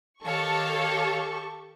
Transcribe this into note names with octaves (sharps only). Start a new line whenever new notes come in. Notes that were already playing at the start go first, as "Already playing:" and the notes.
D#3 G4 A4 C#5 F5 C#6